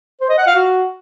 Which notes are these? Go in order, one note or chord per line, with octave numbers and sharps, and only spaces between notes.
C5
D#5
F#5
F5
F#4